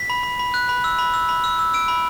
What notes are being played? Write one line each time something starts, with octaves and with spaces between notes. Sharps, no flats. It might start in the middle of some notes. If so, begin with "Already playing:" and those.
Already playing: B6
B5
B5
B5
F#6
B5
E6
B5
E6
B5
E6
E6
E6 D7
B5